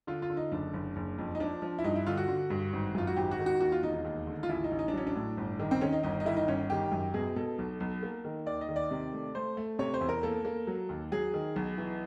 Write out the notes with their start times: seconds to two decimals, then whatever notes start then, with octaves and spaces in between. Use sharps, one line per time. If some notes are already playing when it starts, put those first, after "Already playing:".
0.07 D3 F4
0.22 F4
0.30 D3
0.37 D#4
0.52 F#1 D4
0.73 F#1
0.96 F#1
1.18 F2
1.35 D#4
1.40 F3 D4
1.62 F3
1.79 E4
1.84 G2 D#4
1.96 E4
2.06 D3 F4
2.17 F#4
2.28 D3
2.50 G2
2.73 G#1
2.95 F#2 F4
3.07 F#4
3.17 G#1 G4
3.31 F#4
3.39 D#3
3.46 F#4
3.60 D#2 F#4
3.72 F4
3.83 E1 D#4
3.94 D#4
4.05 D#2
4.27 D3
4.43 F4
4.49 A1 E4
4.64 D#4
4.71 A1
4.79 D#4
4.88 D4
4.93 F#3 C#4
5.07 D4
5.15 A2
5.37 G1
5.60 D#3
5.71 C4
5.81 D#3 C#4
5.93 D#4
6.03 G1 D#4
6.20 D#4
6.26 D#3 E4
6.37 D#4
6.48 G1 C#4
6.70 D#3 G4
6.92 F#2
7.14 B2 G#4
7.36 B2 A4
7.59 B1
7.80 B1
8.03 A#3
8.25 D#3
8.46 D#2 D5
8.61 D#5
8.69 D#3
8.76 D5
8.91 C3
9.13 A3
9.35 A3 C5
9.57 A3
9.79 C3 C#5
9.94 C5
10.01 E2
10.09 A#4
10.23 A#3 A4
10.45 A#3
10.67 F#3
10.89 D#2
11.12 F#3 G#4
11.34 D#3
11.56 B1
11.78 E3